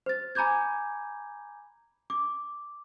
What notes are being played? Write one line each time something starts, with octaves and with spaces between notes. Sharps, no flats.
C5 A6
G#5 A#5 B5 D6 G6 G#6
D6